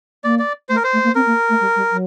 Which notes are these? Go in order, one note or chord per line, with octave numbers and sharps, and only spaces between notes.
A#3 D5
D5
A3 C5
A#4
C5
A3
A#3
C4 A#4
A#3
A3
G3
G3
F#3